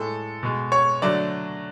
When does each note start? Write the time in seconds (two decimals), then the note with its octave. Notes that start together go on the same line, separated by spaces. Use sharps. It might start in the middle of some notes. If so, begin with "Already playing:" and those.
Already playing: A2 G#3 A4
0.43 B2 G#3
0.72 C#5
1.02 D3 F#3 A3 D5